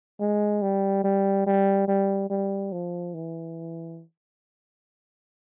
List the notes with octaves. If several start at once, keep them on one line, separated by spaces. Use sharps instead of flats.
G#3
G3
G3
G3
G3
G3
F3
E3